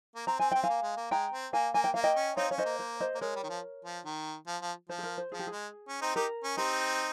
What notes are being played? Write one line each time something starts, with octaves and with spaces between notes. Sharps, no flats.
A#3
C4 A#5
C4 G#5
C4 G5
F5 G#5
A#3
G#3
A#3
G#3 G5 A#5
C4
A#3 F5 G#5
A#3 G#5
G5
A#3 F5
D#5 G5
C#4
C4 D#4 C#5 F5
C#4 C#5
C5 D#5
A#3
C5
C5 D#5
A#3
G#3 A#4 C#5
G3
D#3
F3
F3
D#3
F3
F3
F3 C5
G#4
A#4
C5
F3 G#4
G4
G#4
G#3
C#4
C4 D#4
D#4 G4 A#4
C#4
C4 D#4 G4